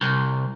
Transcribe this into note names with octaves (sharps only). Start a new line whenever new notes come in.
C2